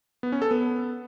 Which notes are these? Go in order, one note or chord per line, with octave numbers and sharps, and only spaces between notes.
B3
C#4
A4
B3